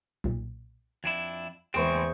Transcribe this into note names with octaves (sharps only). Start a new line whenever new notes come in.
B1 A#2
F2 D4 E4 G#6
E2 C#3 G#3 C4 G#4 C5 C#6